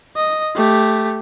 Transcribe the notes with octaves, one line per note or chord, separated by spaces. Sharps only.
D#5
A3 G4